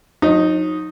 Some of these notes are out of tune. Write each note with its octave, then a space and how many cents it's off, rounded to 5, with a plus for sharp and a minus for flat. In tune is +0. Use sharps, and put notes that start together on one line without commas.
F#3 -45 D#4 +0